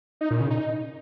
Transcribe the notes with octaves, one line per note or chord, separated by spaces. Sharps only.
D#4
A#2
C#3
D#4